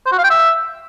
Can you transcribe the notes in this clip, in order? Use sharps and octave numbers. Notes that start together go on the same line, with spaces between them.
C5
F#4
F5
G5
E5